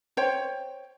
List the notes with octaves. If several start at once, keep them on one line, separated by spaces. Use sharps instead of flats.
C5 C#5 G5